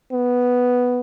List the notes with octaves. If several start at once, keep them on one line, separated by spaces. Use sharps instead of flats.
B3